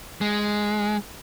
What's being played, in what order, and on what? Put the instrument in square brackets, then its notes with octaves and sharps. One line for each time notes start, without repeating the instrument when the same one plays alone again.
[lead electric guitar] G#3